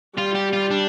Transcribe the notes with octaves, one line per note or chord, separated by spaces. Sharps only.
G3 F4
G4
F4
D4